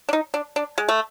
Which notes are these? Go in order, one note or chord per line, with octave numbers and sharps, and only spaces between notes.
D4
D#4
D4
D4
G#3
A3